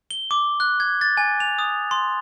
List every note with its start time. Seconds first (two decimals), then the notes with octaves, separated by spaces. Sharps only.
0.11 G7
0.31 D6
0.60 F#6
0.80 G#6
1.01 A6
1.17 G#5
1.40 F7
1.59 D#6
1.91 C6